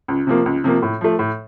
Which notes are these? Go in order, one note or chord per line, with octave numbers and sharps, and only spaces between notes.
C#2
C3 F3 A#3
C#2
C3 F3 A#3
A2
F3 A3
A2